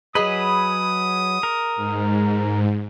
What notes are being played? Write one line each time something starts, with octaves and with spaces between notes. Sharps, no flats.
F#3 G#4 B4 D#5 B5 D#6
A#4
G#2